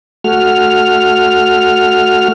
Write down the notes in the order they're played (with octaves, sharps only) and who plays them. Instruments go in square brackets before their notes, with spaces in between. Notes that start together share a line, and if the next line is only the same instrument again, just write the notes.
[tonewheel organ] A3 F#4 F6